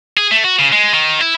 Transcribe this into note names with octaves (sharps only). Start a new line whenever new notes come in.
G#4
A3
F#4
C#3
G#3
D#3
E4